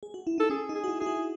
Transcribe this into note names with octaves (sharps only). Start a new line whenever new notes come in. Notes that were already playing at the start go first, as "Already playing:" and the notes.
G#4
F#4
E4
D#4 A4
C#4 G#4
D#4
G#4
F#4
E4
E4 G#4
F#4